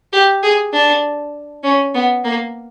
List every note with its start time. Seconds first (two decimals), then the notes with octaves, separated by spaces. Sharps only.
0.13 G4
0.43 G#4
0.73 D4
1.64 C#4
1.94 B3
2.24 A#3